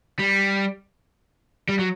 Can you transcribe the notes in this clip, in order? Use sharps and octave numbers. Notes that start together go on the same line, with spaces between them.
G3
G3
F#3